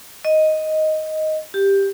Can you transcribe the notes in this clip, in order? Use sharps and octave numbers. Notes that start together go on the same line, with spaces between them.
D#5
G4